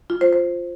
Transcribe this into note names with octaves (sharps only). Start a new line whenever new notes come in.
F4
C5
C5